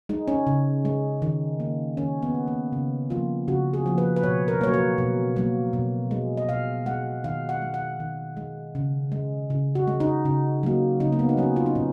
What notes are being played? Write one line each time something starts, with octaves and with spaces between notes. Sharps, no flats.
G#3 D#4
C#4
C#3
G#3
D#3
A#3
D#3 C#4
B3
A#3
A#3
C#3
F3 A#3 F4
C#3 F#4
G#4
F3 A#3
B4
B4
B2 C#5
A#4
F#3 A#3 C#5
B4
B2
F#3 A#3
B2
G#3
D#5
B2 F5
G#3 F#5
D#3 F5
F#5
G#3
F#5
D#3
G#3
C#3
G#3
C#3
F#4
G#3
D#4
C#3
F#3 A#3
C#3 D#4
A#3
B3
D#4
F#3 A#3 C#4
F4
D#4
A#2 C#4